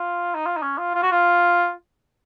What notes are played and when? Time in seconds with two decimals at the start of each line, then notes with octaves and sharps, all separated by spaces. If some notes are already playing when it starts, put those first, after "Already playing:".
Already playing: F4
0.35 D#4
0.46 F4
0.57 D#4
0.62 C#4
0.78 F4
0.95 F4
1.02 F#4
1.11 F4